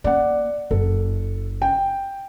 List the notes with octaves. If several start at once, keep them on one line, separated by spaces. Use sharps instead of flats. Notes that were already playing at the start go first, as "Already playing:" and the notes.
A#3 D5 F#5
F#1 A4
G5